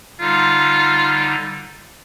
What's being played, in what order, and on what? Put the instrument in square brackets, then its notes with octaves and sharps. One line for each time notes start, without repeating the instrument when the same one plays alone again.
[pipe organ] D3 G3 D#4 [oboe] F4